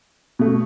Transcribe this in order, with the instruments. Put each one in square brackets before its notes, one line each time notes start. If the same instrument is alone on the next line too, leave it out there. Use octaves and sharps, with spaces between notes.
[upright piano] B2 A3